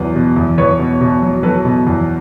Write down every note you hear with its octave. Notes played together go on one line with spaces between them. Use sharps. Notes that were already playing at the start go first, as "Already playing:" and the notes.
Already playing: E2 F#3 B4
B2
E2
E2 B4 C#5
B2
B2
F#3
F#3 A4 B4
B2
E2